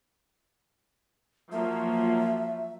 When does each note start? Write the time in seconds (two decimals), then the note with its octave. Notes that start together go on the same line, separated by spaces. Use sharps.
1.52 F3 F#3 A#3 E5